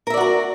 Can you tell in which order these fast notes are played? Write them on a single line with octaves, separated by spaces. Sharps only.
A#4 E5 D5 F#4 A#5